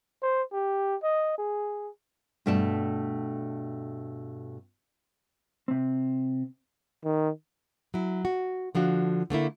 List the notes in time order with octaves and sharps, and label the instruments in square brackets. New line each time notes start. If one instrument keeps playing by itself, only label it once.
[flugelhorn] C5
G4
D#5
G#4
[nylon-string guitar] G2 B2 A3 D5 G5 A5
[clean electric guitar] C3 C4
[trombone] D#3
[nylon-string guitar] F#3 E4
F#4
D3 F3 D4 F#4
D3 A3 A#3 E4